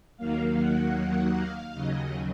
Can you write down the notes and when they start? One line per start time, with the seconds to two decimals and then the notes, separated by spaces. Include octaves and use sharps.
0.17 D#2 D#3 F#3 A#3 F5
0.57 F#5
1.35 F5
1.73 D#2 C#3 F#3 D#5